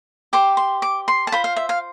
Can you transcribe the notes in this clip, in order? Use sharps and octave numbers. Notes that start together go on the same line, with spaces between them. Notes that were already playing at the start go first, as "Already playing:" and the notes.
G4 C5 D6
C6
D6
C6
A5
F4 C5 B5
F5
E5
F5